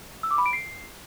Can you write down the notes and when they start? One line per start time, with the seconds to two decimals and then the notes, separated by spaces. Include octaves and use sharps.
0.23 E6
0.31 D6
0.38 B5
0.46 D7
0.53 C7